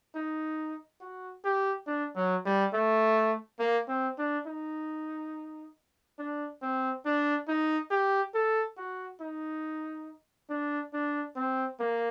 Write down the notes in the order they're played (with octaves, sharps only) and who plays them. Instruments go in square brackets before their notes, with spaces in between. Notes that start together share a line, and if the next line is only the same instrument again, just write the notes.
[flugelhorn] D#4
F#4
G4
D4
F#3
G3
A3
A#3
C4
D4
D#4
D4
C4
D4
D#4
G4
A4
F#4
D#4
D4
D4
C4
A#3